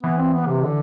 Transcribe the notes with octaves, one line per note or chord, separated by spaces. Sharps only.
E3 B3
C4
B3
C3
D3